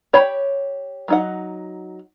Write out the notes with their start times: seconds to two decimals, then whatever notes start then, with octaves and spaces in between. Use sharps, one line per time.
0.13 G4 C#5 G5 B5
1.08 F#3 D#4 F#5